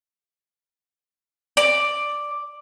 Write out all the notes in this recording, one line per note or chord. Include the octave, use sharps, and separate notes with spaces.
D5